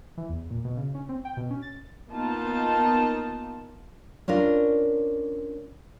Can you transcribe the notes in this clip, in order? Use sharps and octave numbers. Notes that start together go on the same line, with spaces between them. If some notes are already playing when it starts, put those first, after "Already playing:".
E3
E2
A#2
B2
C#3
C#4
C4
G5
B2
C#4
A6
A#3 B3 D#4 F4 A5
C#4 D4 F4 A#4